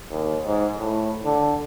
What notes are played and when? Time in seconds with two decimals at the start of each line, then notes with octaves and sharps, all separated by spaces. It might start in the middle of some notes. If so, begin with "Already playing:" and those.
0.10 D#2
0.46 G#2
0.78 A2
1.25 D3